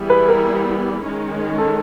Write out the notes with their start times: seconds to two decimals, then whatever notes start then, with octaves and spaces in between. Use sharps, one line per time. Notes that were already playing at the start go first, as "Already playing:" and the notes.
Already playing: E3 G3 B3 E4 G#4
0.10 B4
0.29 A#4
1.02 D#3 G#3 C#4
1.58 A4